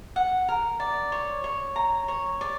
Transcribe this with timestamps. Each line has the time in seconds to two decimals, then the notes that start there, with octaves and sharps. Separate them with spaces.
0.16 F#5
0.48 A#4
0.80 D5
1.12 C#5
1.44 C#5
1.76 A#5
2.08 C#5
2.41 D5